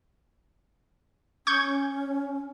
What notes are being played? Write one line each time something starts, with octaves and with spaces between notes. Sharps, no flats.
C#4 C#6 G6 G#6